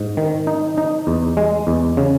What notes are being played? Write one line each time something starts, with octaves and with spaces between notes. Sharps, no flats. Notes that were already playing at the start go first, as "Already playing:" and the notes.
Already playing: G#2
D#3
D#4
D#4
E2
G#3
E2
C#3